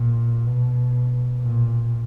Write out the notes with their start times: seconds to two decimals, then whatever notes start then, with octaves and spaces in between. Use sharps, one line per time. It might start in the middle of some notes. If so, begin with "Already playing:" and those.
Already playing: A#2
0.46 B2
1.41 A#2